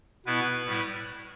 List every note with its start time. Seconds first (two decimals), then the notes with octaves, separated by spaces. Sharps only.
0.26 B2 B3 E4 B4
0.66 A2 G3 E4